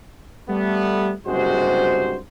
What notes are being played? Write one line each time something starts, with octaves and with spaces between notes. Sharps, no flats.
G3 A3 B3
F#1 G2 C3 G#3 F#4 C5